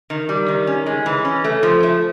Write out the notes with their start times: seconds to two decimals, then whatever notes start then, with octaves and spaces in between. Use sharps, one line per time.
0.10 D#3
0.29 G3
0.48 D#3
0.67 C#4
0.86 G#3
1.06 E3
1.25 C#4
1.44 A3
1.63 F3
1.83 A3